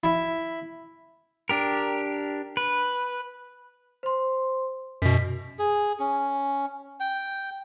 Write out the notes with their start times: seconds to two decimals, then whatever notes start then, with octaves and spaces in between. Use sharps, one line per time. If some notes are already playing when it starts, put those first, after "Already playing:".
0.04 E4
1.49 D4 G4 A#4
2.57 B4
4.03 C5 C6
5.02 F#2 B2 B6
5.59 G#4
6.00 C#4
7.00 G5